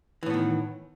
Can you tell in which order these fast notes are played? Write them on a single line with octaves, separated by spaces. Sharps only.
E3 A2 B3 D#3